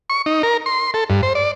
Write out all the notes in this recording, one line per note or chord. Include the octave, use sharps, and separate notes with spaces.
C#6
D#4
A#4
C6
A4
G2
C5
D5